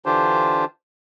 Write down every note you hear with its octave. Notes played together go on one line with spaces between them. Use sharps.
D3 E3 D4 F4 G4 C5